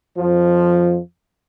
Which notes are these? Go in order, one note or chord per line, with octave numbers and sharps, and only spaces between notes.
F2 F3